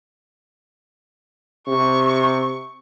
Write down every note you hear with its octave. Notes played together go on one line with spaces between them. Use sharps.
C3 C#6